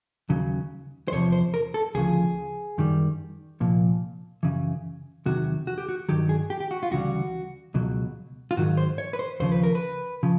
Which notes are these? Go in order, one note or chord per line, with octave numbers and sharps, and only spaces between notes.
D#2 C#3 F#3
C5
E2 C3 F3 C#5
C5
A#4
A4
D2 C#3 F3 G#4
F#2 D#3 G3
C2 A#2 F3
F#2 C#3 E3
E2 C3 D#3 F#3 F#4
F#4
G4
F#4
G2 D#3 F#3 G4
G#4
G4
G4
F#4
F4
D2 C#3 E3 G3 F#4
C#2 B2 F#3
F4
G#2 D#3 F#3 F#4
C5
C#5
B4
C5
D#2 C#3 F3 C5
B4
A#4
B4
C#3 F3